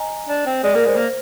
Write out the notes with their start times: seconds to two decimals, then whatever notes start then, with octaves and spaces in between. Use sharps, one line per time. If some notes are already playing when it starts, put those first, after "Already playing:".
Already playing: D#5 G#5 A#5
0.28 D4
0.46 C4
0.64 G#3 D5
0.75 A#3 A#4
0.85 G#3 C5
0.96 A#3